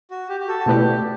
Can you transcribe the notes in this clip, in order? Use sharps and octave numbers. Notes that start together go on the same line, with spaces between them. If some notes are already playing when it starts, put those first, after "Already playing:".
F#4
G4
G4
F#4 A4
F#4
B2 A3 E4 G4 B4 D5